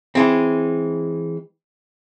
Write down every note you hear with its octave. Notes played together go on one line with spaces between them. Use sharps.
E3 G#3 C4